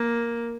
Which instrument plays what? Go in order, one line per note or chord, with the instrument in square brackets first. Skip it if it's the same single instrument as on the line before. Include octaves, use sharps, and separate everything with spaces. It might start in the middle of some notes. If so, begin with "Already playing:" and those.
Already playing: [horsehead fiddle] A#3